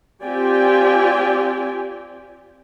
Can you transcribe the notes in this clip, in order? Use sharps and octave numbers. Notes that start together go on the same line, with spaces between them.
C4 F4 G4 D5 G5 G#5